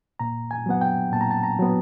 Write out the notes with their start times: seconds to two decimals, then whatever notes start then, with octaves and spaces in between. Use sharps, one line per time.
0.19 A#2 A#5
0.51 G#5
0.66 F#3 B3 F#5
0.81 G5
1.12 A#2 A5
1.21 A#5
1.31 A5
1.43 A#5
1.59 F#3 B3